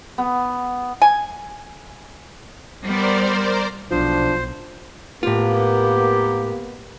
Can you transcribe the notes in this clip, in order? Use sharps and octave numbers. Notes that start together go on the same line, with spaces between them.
B3
G#5
G3 B3 A#4 C5 D5
B1 F3 D4 C5
A2 A#3 B3 F4 G4